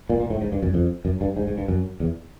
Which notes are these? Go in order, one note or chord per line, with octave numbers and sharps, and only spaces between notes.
A#2
A#2
A2
G#2
G2
F#2
F2
F#2
G2
G#2
G#2
G2
F#2
E2